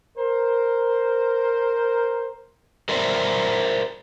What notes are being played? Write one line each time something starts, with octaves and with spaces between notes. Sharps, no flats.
A#4 C5
A#4 C5 D5 E5 A#5